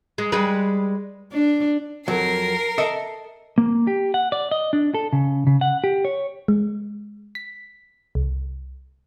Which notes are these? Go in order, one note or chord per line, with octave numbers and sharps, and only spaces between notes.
G#3
G3 G#3 B4
D4
F2 F#3 A#4 C7
A4 D#5 E5
A#3
G4
F#5
D5
D#5
D4
A4
C#3
C#3
F#5
G4
C#5
G#3
B6
C2